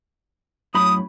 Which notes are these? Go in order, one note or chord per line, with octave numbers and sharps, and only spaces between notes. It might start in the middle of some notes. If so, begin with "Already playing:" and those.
F#2 A2 B5 D#6